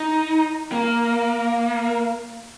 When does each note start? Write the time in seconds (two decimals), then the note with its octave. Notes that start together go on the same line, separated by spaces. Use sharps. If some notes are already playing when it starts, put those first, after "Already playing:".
Already playing: D#4
0.72 A#3